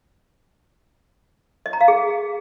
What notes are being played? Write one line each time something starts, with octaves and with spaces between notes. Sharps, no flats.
D#5
A#5
F5
G#4